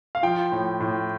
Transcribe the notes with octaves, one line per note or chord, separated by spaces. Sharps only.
F5
F3 G5
A2
A2